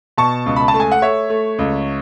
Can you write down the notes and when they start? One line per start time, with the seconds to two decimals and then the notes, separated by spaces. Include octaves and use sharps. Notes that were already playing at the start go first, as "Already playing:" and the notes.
0.18 B2 A5 C#6
0.46 C#2
0.56 B5
0.68 A5
0.74 A3
0.80 G#5
0.92 F#5
1.02 A3 C#5 E5
1.30 A3
1.59 C#2